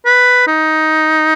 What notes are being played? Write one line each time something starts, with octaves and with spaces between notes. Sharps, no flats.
B4
D#4